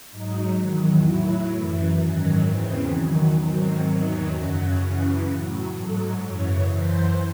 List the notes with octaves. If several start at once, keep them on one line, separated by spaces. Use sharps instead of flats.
G#2 F#3 D#4
E2 D#3 F#3
A2 F#3 E4
F#2 E3
G#2 D#3 F#3 C#4
E2 C#3 E3 C4
E2 D#3 F#3
G#2 D#3 F#3 C4
E2 D#3 F#3
F#2 C#3 F#3 C#4
F#2 C#3 E3
A2 F#3
G#2 F#3 A4
F#2 C#3 E3 C#5
F#2 E3 C5